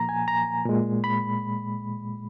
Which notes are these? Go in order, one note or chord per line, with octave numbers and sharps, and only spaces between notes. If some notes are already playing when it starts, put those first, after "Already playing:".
Already playing: A#2 F3 A#3 A#5
G#5
A#5
A#2 G#3
B5